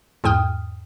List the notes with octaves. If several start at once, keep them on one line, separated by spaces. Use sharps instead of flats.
E2 G#2 G5 D#6 F6